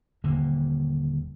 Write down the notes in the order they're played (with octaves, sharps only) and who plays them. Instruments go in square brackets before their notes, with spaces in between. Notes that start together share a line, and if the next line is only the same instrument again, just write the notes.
[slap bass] D#1 D3 A#3